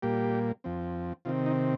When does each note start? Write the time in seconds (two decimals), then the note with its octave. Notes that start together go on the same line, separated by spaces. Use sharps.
0.02 A#2 G3 A#3 G4
0.64 F2 F3 C4
1.25 C3 D#3 C4 F4
1.46 D#4